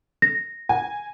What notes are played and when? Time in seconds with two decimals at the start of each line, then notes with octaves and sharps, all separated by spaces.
0.22 A#6
0.69 G#5